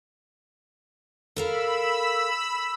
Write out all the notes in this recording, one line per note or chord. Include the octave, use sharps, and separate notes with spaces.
A4 A#4 F5 B5 E6